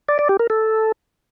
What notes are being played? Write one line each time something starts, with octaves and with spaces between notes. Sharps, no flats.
D5
D5
G4
A#4
A4